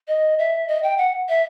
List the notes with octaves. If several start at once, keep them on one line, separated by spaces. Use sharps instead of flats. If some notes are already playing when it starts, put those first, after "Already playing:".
D#5
E5
D#5
G5
F#5
E5